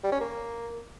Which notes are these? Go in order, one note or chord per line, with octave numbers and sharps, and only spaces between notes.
G3
C#4
A#3